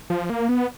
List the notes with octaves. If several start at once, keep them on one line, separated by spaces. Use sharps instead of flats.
F3
A#3
B3